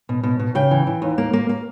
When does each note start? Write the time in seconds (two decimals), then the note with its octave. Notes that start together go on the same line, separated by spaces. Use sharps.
0.09 B2
0.23 B2
0.39 B2
0.55 C#3 G5
0.71 E3
0.87 E3
1.02 D#2
1.18 A#3
1.33 A#3
1.49 A#3